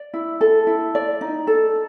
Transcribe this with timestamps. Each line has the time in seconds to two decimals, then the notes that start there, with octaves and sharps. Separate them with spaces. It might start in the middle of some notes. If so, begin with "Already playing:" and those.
Already playing: D5
0.14 E4
0.41 A4
0.67 E4
0.95 D5
1.21 D#4
1.47 A4